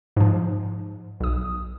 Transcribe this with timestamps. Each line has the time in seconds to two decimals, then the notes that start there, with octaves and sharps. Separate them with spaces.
0.17 G#2 F3
1.20 B1 D#6